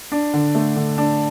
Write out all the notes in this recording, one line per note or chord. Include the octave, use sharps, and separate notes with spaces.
D4
D3
A3
D3
D4